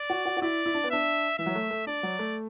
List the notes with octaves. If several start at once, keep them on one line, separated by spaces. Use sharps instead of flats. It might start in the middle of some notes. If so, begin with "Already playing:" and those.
Already playing: D5
F#4
F#4
F#4
E4 D5
E4
D4
B3
D4 E5
E3 E5
F#3
A3
A3
D4 D5
F#3
A3